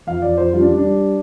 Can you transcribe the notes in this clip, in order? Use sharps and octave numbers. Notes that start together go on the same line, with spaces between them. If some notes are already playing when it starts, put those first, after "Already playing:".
F2 F5
F2 D5
F2 C5
G3 F4
D4
G3
D4
G3